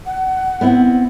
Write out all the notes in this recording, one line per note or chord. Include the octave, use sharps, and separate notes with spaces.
F#5
B3 C4 E4